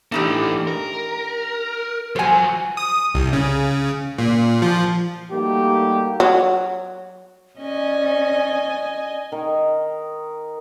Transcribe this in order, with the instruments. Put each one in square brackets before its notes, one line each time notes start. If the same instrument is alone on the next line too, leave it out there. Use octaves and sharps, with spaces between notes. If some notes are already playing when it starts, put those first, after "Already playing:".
[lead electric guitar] E3 A3 [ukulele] D4 D#4 G4
[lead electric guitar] A#4
[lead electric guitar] F3 F#3 [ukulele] C5 G#5
[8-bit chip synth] D#6
C2
C#3
A#2
F3
[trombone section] G3 A3 A#3 D#4 F#4 G4
[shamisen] F#3
[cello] C#4 [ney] D5 [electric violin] D#5 G#5
[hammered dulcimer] D#3